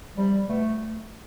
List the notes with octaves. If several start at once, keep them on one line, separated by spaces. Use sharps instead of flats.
C3 F3 G3
B2 A3